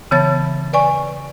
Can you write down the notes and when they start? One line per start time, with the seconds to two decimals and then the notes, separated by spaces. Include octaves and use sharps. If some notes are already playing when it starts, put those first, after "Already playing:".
0.11 C#3 E3 B3 C#5 A5 A6
0.73 B4 D5 G#5 C#6